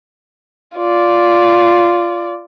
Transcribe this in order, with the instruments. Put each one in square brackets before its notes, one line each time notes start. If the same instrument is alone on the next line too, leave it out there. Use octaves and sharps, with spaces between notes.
[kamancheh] F4 D5